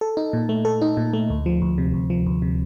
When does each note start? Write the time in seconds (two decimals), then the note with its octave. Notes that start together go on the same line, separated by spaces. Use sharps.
0.01 A4
0.17 D#4
0.33 A#2
0.49 A3
0.65 A4
0.82 D#4
0.97 A#2
1.13 A3
1.30 D2
1.46 F3
1.62 D2
1.78 C3
1.94 D2
2.10 F3
2.26 D2
2.42 C3